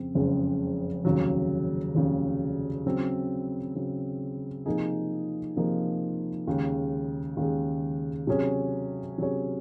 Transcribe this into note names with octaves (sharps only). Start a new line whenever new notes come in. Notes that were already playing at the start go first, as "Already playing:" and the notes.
Already playing: F2 C#3 C4
F#1 F2 C#3 G#3 C4
F1 D#2 C#3 F#3
F1 D#2 C#3 F#3
C#3 F#3 C4
C#3 F#3 C4
C3 F3 A#3 D#4 G#4
C3 F3 A#3 D#4 G#4
D#2 C#3 G#3
D#2 C#3 G#3
C3 F#3 C#4 G#4 C#5
C3 F#3 C#4 G#4 C#5